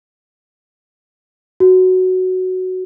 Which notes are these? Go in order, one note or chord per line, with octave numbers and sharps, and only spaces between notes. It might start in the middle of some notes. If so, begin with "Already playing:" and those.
F#4